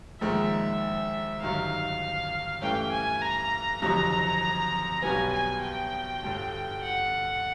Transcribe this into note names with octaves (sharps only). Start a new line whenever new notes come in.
A#1 G#2 D#3 G#3 E5
G1 G2 D#3 F#3 F5
G2 E3 A3 C#4 G5
G#5
A#5
G1 F2 C3 D#3 F#3 A#5
B1 B2 G3 B3 G#5
G#5
G5
G1 G2 D3
F#5